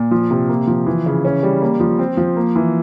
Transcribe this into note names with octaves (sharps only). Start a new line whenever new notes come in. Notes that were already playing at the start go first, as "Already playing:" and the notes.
Already playing: A#2
F3
C3
A#3
F3
E3
C#3
C#4
G3
A#3
F3
C4
F3
A#3
E3